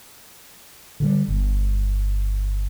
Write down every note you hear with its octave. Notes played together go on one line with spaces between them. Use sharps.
D3 D#3 G3
G1